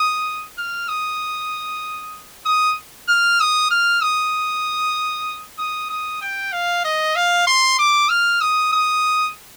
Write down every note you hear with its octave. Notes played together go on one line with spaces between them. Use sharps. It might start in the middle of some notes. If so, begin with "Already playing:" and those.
Already playing: D#6
F6
D#6
D#6
F6
D#6
F6
D#6
D#6
D#6
G5
F5
D#5
F5
C6
D6
F6
D#6
D#6